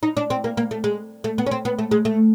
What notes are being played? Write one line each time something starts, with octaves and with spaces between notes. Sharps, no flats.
D#4
D4
C4
A#3
A#3
A3
G#3
A3
B3
C#4
C4
B3
A3
G#3
A3